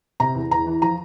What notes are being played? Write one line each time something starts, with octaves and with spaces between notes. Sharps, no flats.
C3 A#5
E2
E2 A#5
E3
F3 A#5